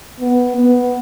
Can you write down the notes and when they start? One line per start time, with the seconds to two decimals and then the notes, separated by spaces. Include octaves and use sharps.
0.20 B3
0.56 B3